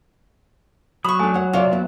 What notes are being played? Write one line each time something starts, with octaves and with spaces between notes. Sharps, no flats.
F#3 B5 C#6 D#6
A3 D4 G#5
C#5 F#5
C3 F4 C#5 D5
B3 E4